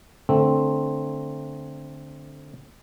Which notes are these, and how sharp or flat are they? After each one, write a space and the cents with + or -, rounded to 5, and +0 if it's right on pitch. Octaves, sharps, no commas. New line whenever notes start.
D3 +0 A3 +0 C4 +5